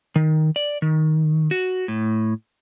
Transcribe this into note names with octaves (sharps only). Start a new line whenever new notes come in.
D#3
D5
D#3
F#4
A2